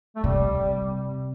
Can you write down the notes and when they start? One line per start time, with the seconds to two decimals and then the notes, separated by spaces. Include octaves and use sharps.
0.16 A3
0.23 C3 G3